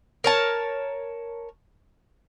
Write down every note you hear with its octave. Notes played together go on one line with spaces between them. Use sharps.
A#4 C#5 A5